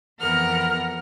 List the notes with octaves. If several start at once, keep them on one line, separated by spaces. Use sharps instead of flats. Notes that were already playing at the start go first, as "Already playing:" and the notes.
F2 E3 B3 A#4 F#5 F6